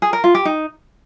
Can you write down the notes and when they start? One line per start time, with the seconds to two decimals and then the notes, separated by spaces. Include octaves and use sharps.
0.02 G#4
0.13 A#4
0.24 F4
0.35 G4
0.45 D#4